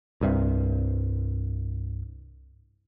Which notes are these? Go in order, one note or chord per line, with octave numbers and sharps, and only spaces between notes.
C2 G2 C3